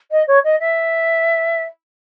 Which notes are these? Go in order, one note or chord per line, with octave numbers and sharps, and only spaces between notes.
D#5
C#5
D#5
E5